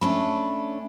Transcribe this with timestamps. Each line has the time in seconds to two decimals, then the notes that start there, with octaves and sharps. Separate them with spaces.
0.01 A3 C#4 D4 B5